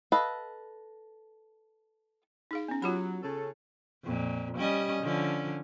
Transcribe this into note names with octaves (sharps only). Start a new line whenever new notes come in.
A4 B4 D#5 F5
D#4 G#4 F5
B3 C#4
F#3 F4 G4 B5
C#3 C#4 A4
F2 A#2
G3 C#4 D#5
D3 F3 C#4